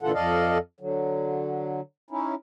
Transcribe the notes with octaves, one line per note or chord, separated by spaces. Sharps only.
A#2 D3 E3 F4 A4 F#5
F2 A4 D5 D#5 F5
D3 F#3
C#4 D#4 E4